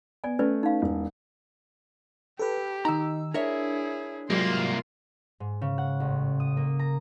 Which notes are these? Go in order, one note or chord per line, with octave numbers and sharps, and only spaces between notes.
B3 D5 G#5
A3 C#4 B4 D5
D#4 F5
E1
G4 A4 B4
D#3 D#4 A#5 E6
D4 E4 G#4 A#4 C#5 E5
C2 G#2 F#3 G3 A#3 F4 C6
G#2
C#3
F#5
A1
D#6
A#3
A#5